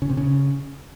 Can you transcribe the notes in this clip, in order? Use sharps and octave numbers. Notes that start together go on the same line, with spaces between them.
C#3
C3
C#3